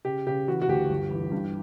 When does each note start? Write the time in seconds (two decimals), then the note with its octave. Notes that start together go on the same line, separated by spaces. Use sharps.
0.05 C#3 G4
0.26 C#3 G4
0.48 E3 F#4
0.62 F#4
0.68 D2 G4
0.90 G1
1.11 E3
1.32 G2